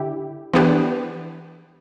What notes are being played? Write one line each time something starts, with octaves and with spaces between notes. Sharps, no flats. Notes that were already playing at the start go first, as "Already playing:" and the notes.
Already playing: D3 E4 G4
E3 B3 D4 G4 B4